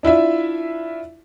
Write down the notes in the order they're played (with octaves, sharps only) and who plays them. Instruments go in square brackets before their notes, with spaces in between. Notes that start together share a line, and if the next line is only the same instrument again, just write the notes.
[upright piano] D4 E4 F4 E5